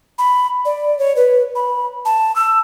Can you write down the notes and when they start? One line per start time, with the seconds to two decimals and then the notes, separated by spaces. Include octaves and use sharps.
0.18 B5
0.65 D5
0.99 C#5
1.16 B4
1.55 B5
2.05 A5
2.36 E6